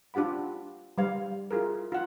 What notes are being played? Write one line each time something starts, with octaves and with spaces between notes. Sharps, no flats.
D4 F4 G4 F#5 B5
G3 F5
E4 F4 G#4 A#4
F4 F#5